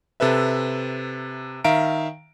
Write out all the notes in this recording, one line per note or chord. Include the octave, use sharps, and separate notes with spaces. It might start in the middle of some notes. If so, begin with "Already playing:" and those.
C3 A4 B4 E5
D#3 E5 F5 A#5 D7